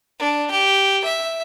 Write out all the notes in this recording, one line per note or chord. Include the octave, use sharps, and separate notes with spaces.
D4
G4
E5